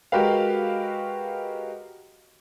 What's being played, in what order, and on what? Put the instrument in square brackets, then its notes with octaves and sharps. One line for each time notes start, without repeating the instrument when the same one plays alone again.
[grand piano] G#3 F#4 G4 A#4 B4 F5